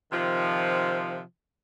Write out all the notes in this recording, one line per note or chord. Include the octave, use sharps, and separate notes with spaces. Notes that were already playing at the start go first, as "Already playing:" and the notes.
C3 D#3 F3